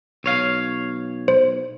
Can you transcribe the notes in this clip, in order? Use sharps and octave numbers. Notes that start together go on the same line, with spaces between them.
B1 C#5 F5
C5